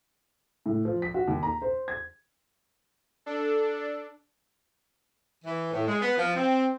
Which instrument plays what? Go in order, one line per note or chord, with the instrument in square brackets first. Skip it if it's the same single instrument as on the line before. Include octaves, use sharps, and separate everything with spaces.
[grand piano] A2
F3
B6
F#4
D#2
A#5
C5
G#6
[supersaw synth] D4 A4
[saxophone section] E3
A2
G#3
B3
F3
C4